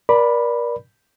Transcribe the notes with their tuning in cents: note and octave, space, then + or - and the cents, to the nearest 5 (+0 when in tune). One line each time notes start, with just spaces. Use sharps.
A#4 +35 D5 +0 B5 +0